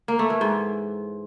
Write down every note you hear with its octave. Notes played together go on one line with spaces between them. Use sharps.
A#3
A3
E3
G#2